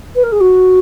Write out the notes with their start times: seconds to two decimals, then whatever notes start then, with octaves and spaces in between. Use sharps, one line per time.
0.15 B4
0.23 A#4
0.32 G#4
0.40 F#4